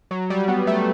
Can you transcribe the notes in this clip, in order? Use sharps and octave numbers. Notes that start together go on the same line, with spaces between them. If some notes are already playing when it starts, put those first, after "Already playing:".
F#3
G3
B3
A3